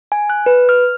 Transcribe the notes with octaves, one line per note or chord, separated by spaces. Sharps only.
G#5
F#6
B4
F6